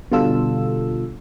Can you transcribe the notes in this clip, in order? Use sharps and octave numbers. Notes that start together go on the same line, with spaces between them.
B2 D3 G3 F4 A4 E6